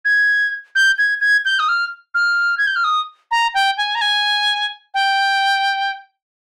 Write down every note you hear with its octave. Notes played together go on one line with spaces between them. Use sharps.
G#6
G6
G#6
G#6
G6
D#6
F6
F6
G#6
G6
F6
D#6
A#5
G5
G#5
A#5
G#5
G5